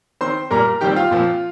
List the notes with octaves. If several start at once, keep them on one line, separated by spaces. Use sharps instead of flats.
D#3 C4 C5 C6
A#2 G3 A#3 A#4 A#5
D#3 G3 C4 G4 G5
F4 F5
A#2 F3 C4